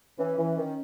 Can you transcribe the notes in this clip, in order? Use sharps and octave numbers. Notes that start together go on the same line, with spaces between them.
E3 C#4
E3
D#3